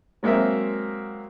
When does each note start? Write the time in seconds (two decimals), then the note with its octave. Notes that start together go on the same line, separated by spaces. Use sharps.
0.23 F#3 G#3 A#3 C4 E5